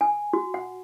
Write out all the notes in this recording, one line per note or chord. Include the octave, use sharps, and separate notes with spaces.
G#5
F#4
F#5